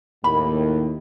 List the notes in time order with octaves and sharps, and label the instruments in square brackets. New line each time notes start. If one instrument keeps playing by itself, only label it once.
[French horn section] D#2 A2 [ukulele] B5